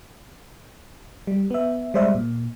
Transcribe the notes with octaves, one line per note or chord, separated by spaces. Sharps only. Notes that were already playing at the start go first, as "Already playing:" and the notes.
G3
B3 E5
G3 G#3 C5 D5 E5
A#2